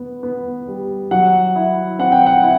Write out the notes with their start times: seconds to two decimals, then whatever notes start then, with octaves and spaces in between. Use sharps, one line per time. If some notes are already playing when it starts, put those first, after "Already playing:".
Already playing: B3
0.23 B3
0.68 G3
1.11 F#3 F#5
1.55 E4
1.99 C4 F#5
2.12 G5
2.26 F#5
2.43 E4